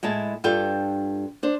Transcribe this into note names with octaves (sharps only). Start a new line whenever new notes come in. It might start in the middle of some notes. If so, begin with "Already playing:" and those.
A2 G#3 E4 A5
G2 D4 F4 A4 G5
D4 C5